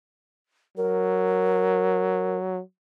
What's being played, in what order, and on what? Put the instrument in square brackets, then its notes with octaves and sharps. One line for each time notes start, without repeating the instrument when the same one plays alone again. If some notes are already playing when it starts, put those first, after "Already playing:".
[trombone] F#3 [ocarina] A#4